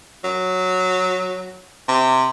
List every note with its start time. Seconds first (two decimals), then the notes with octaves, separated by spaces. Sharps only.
0.24 F#3
1.89 C3